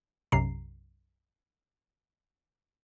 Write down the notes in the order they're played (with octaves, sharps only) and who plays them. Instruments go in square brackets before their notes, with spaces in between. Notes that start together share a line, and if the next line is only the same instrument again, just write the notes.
[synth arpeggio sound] B1 F#2 C3 A#5 C7